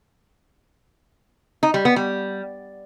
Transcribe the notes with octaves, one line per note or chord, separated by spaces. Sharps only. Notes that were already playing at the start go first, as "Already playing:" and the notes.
D#4
G3
B3
G3